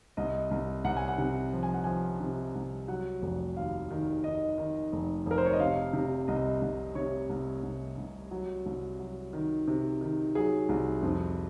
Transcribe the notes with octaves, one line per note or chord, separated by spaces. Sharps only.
C2 D#5
C2
C2 F#5
G#5
F#5
C3
F3
G#5
F#5
F3 G#5
C3
C2
F#3 F#5
F1
D#2 F5
D#3
D#3 D#5
D#3
F1
F1 A#4
C5
C#5
D#5
C3 F5
C3
C2 D#5
C2
C3 C#5
C2
C2
C2
F#3
C2
F#3
D#3
C3
D#3
F#3 G#4
C2
F2